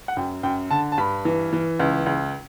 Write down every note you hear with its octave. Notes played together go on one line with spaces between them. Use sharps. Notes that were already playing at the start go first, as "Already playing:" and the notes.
F#5
F#2 G5
F#2 G5
D3 A5
A5
G2 B5
E3
E3
C#2
C#2